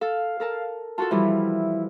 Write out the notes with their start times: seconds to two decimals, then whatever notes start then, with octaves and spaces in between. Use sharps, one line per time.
0.01 A4 F5
0.40 A4 A#4 A5
0.98 F4 F#4 A4 A5
1.11 E3 F3 G3 E4